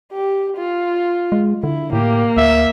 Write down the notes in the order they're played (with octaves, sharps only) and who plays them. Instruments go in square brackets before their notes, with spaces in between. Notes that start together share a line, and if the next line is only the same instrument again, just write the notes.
[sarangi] G4
F4
[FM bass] G#3
[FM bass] D3 [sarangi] E4
[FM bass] A2 [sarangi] A#3 [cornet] G4
[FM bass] D2 [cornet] E5